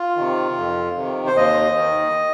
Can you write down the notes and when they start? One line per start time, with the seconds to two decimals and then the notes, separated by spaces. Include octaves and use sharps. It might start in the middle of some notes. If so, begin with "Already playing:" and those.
Already playing: F4
0.16 C3 D#3
0.57 F2
0.97 C3 D#3
1.27 C5
1.36 D#2 D#5
1.76 D#3